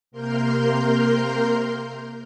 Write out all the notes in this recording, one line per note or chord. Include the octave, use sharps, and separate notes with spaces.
C3 A#3 A#4 C6 F6 G6